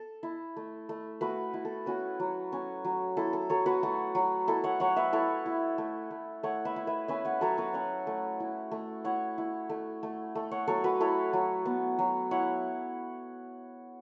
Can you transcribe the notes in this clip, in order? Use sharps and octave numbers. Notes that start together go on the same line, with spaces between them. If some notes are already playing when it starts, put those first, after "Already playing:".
Already playing: A4
E4
A3
A3
A3 F#4 B4
E4
A4
C#4 F#4 B4
F#3
C#4
F#3
E4 A4
A4
F#3 A4 C#5
F#4 B4
A3 F#4
F#3
E4 A4
C#5 F#5
F#3 C#5 F#5
B4 E5
E4 A4 C#5
E4
A3
A3
A3 C#5 F#5
B4 E5
E4
B4 E5
C#4 B4 E5
C#5 F#5
F#3 A4 C#5
F#4 B4
C#4 C#5 F#5
A3
E4
A3
E4 C#5 F#5
E4
A3
A3
A3
C#5 F#5
F#3 A4 C#5
F#4 B4
E4 A4 C#5
F#3
B3
F#3
E4 C#5 F#5